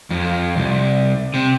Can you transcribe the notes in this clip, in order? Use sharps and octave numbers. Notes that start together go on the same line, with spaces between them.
F2
C2
C3